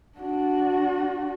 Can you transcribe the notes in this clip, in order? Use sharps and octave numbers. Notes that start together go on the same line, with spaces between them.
D4 F#4